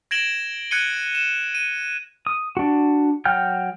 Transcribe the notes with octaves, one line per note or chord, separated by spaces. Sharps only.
G#6 A#6 D7 E7 F#7 G7
F#6 G#6 C#7 D#7 G7
E7
D#7
D#6
D4 F#4
F#3 F#5 G5 F6 G6